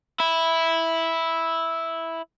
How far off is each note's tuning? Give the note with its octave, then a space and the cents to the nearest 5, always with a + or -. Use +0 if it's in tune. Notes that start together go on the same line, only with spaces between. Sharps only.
E4 -5